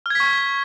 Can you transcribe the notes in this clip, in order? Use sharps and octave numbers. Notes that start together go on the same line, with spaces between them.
C#6 F6 G#6 B6